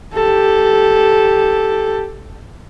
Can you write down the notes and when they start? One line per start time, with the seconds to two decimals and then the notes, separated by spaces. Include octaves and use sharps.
0.14 G4 A4